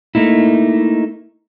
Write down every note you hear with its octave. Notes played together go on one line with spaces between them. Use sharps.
A3 A#3 D#4 E4